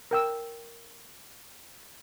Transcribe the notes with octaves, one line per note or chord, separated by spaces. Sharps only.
A#4 G5 E6